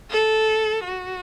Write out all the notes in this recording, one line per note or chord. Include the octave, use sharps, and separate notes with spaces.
A4
F#4